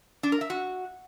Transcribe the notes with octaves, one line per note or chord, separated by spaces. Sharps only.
D4
A#4
E5
F#4